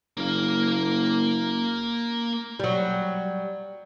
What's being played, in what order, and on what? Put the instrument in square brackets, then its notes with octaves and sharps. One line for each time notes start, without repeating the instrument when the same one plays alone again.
[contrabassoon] F#1 [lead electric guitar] A#3 F5
[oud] F#3 G3